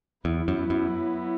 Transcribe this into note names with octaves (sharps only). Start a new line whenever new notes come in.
E2 F#3 B3 E4
F#2
F#2